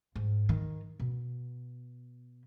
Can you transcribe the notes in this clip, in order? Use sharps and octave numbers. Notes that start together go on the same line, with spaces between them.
G#2
D#3
B2